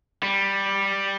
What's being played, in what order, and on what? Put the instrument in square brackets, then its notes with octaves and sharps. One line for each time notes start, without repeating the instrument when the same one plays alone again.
[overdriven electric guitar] G3